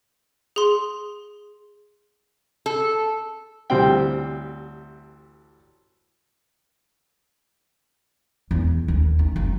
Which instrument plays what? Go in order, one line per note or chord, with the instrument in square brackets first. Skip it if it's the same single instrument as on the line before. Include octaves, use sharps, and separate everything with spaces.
[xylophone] G#4 C6
[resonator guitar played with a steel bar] A4
[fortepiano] A1 D2 G3 C4 G5
[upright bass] E2
D#2
D#4
F#1